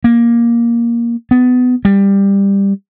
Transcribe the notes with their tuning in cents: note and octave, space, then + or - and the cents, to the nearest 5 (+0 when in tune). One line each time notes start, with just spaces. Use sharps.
A#3 +10
B3 +20
G3 +15